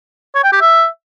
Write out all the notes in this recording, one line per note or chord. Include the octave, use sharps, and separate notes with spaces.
C#5
G5
G4
E5